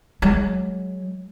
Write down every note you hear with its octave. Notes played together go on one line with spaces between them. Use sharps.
F#3 G#3